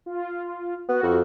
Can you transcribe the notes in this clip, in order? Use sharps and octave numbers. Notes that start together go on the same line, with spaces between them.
F4
B3 F#4
F2